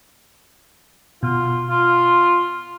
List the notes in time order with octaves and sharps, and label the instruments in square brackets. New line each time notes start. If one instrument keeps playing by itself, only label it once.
[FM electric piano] B2 [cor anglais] F4
[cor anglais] F4